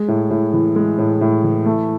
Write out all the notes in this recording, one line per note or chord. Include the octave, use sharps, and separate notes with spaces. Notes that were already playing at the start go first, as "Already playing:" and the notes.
Already playing: G#3
A2
A2
E3
G#3
A2
A2
E3
A3